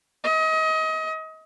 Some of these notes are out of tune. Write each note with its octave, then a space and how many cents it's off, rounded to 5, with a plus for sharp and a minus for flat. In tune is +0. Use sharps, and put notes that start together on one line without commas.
D#5 +30